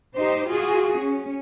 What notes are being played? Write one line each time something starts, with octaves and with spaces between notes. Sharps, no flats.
D#4 G4 C5
F4 F#4 G#4
C#4